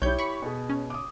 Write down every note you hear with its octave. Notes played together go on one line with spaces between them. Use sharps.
B1 E4 G4 C#5 G6
B5 C#6
B2 G#4
C#4
D6 D#6